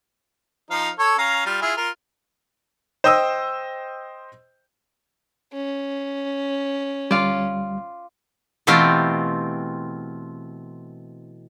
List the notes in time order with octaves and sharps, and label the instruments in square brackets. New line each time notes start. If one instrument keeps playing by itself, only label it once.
[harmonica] F3 D#4 F5
A4 C#5
C#4 F5 A#5
G3 F4
E4 F4 G#4
F4 A#4
[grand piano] C5 D#5 G5 D#6 E6
[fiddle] C#4
[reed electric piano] D2 G3 [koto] F4 D5
[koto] B2 E3 A3 C4 F4 G4